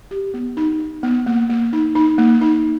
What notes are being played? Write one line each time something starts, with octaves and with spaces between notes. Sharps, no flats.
G4
B3
D#4
D#4
B3
A#3
A#3
D#4
D#4
A#3
D#4